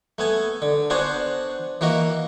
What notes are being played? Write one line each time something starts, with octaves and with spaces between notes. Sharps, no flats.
A3 B3 G#5
D3
B3 D4 F#4 C5 G#5
E3 A#3 F#4 D#5